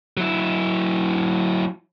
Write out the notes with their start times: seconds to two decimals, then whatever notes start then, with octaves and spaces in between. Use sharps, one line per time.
0.17 F#3 E4